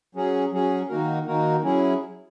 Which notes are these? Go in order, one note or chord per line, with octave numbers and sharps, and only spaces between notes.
F#3 C#4 G#4
F#3 C#4 G#4
D#3 A#3 D#4 F#4 A#4
D#3 A#3 D#4 F#4 A#4
F#3 C#4 E4 G#4